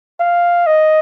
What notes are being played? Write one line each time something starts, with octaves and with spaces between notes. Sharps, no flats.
F5
D#5